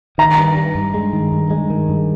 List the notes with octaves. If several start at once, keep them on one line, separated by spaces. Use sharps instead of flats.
D#3 A#5
G2
G2
G2
G#3
D#3
G2
G#3
D#3
G2